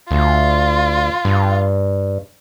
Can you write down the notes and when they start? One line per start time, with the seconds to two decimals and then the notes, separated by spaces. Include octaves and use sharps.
0.11 D2 F4
1.25 G2